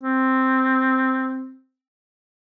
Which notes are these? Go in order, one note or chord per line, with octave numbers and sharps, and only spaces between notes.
C4